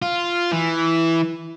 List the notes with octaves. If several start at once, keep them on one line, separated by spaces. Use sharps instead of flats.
F4
E3